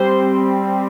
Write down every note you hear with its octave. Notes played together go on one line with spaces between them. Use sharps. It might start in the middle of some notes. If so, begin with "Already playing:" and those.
Already playing: G3 C4 C5